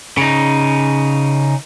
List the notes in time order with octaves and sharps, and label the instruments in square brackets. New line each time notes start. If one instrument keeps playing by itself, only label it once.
[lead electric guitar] C#3 D#4